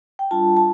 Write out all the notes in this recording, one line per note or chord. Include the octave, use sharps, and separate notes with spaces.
G5
G3 D4 F4 A5
A5